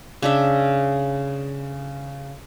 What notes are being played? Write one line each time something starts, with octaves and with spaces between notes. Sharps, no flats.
C#3 D4 E5